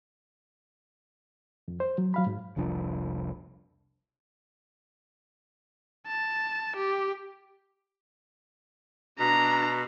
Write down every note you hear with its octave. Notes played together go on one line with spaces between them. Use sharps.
F2
C5
F#3
F#3 F5 B5
G#2
F1 C2 F3 D4
A5
G4
B2 D4 A#5